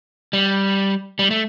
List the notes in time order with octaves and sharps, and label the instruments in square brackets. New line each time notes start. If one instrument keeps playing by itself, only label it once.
[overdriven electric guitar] G3
G3
A3